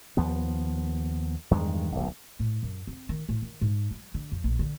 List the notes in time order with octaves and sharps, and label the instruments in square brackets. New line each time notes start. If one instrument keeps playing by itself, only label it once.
[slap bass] D#2 F3 B3
E2 G2 D#3 G#3
D1 B1
[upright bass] A2
F#2
C4
D#3
A2
D#3
G#2
F#3
D3
F2
A#1
D3